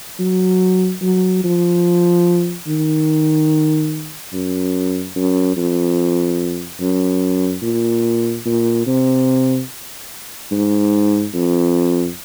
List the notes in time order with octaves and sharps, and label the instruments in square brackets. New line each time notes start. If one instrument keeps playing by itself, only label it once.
[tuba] F#3
F#3
F3
D#3
F#2
F#2
F2
F#2
A#2
A#2
C3
G#2
F2